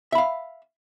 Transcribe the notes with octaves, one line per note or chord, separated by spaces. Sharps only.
E5 F5 B5